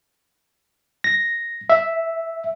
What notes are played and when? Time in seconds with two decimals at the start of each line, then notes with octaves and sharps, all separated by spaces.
1.04 A#6
1.70 E5